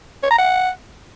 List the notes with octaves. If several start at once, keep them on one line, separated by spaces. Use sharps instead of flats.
C#5
A#5
F#5